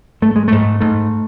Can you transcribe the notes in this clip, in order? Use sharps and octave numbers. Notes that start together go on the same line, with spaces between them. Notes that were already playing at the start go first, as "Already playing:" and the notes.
G#2 A3
G#3
G#2 A3
G#2 A3